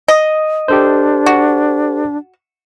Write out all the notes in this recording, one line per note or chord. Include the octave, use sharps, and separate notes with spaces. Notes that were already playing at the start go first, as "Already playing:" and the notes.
D#5
D4 G4 A4 C5
F#4